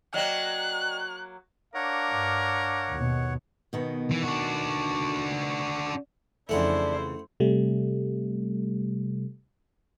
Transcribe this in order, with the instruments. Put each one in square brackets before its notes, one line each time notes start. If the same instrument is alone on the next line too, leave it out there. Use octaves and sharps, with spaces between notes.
[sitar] F#3 A#3 [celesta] D5 D#5 G5 [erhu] F#6
[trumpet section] D4 F5 D6 [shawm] A#4 [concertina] C#5 F#5
[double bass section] G2
D#2 B2
[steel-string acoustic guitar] B2 D#3 B3
[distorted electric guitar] E3
D4 F#4
[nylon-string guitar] F2 C#3 E3 [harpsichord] A3 F#5 [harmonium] D4 [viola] E4 C5
[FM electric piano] C3 G3 A3